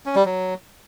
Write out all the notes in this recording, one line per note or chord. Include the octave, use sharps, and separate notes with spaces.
C#4
G3
F#3